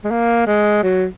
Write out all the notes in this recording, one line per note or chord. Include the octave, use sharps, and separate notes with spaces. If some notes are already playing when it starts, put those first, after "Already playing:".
G#3
A#3
G#3
F#3